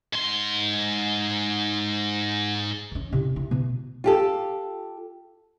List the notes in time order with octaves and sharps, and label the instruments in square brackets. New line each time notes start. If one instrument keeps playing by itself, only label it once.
[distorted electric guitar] G#2 C6
[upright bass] E3 C#4
C3 E4
E4
B2
[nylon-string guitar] F4 G4 A4